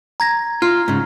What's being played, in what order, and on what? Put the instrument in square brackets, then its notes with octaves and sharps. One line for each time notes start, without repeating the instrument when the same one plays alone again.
[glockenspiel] A#5 G#6 A#6
[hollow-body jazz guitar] F4 [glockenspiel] F6
[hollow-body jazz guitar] G#2 C#3